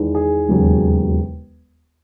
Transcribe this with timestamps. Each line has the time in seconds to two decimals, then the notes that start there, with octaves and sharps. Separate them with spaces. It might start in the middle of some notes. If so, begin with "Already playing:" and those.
Already playing: E2 D#3 G#3
0.15 G#4
0.48 E1 D#2 C#3 F#3